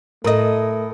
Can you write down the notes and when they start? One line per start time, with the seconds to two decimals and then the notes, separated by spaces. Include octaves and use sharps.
0.24 A2 A3 A#4 D#5 D#6